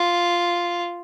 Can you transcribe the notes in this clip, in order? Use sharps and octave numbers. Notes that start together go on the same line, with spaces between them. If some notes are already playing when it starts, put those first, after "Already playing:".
Already playing: F4